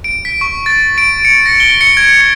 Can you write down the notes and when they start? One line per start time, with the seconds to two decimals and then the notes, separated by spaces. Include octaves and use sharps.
0.04 D7
0.25 B6
0.41 C#6
0.66 A6
0.98 D7
1.25 C#7
1.46 A#6
1.60 G7
1.81 C#7
1.97 G#6
2.21 C#7